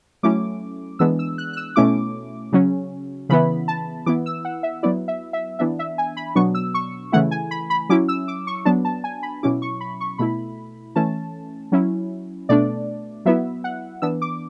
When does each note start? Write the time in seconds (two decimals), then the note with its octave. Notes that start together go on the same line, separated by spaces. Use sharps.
0.23 F#3 A3 C#4 E4 D6
0.99 E3 G#3 B3 D4 E6
1.19 E6
1.38 F#6
1.53 F#6
1.57 E6
1.76 B2 A3 C#4 E4 D6
2.52 C#3 F#3 C#4
3.29 C#3 E3 B3 E4 B5
3.68 A5
4.06 E3 B3 E4 D6
4.26 E6
4.45 F#5
4.63 E5
4.83 F#3 B3 E4 D5
5.08 E5
5.33 E5
5.59 E3 B3 D4 E5
5.79 E5
5.98 G#5
6.17 B5
6.35 B2 F#3 B3 D4 C#6
6.55 E6
6.74 C#6
7.12 C#3 E3 A3 E4 F#5
7.31 G#5
7.51 B5
7.70 B5
7.89 F#3 C#4 E4 D6
8.08 E6
8.28 D6
8.47 C#6
8.65 F#3 B3 D4 A5
8.85 A5
9.04 G#5
9.23 B5
9.43 B2 F#3 C#4 E4 D6
9.62 C#6
9.81 B5
10.01 C#6
10.18 B2 A3 E4 B5
10.96 E3 A3 C#4 A5
11.72 F#3 C#4 E4
12.49 B2 A3 D4 D5
13.25 F#3 B3 E4 E5
13.64 F#5
14.02 E3 B3 D4 E6
14.22 D6